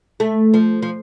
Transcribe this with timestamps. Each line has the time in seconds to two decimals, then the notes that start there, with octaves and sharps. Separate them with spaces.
0.20 A3
0.54 F3
0.82 F3